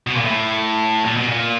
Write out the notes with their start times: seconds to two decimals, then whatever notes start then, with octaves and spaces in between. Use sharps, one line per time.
0.07 B2
0.16 A#2
0.25 A2
1.05 A#2
1.16 B2
1.28 A#2